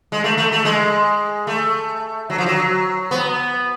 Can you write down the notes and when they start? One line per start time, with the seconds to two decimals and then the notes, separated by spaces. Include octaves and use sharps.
0.12 G#3
0.24 A3
0.38 A3
0.52 A3
0.65 G#3
1.47 A3
2.30 F#3
2.38 F3
2.46 F#3
3.11 B3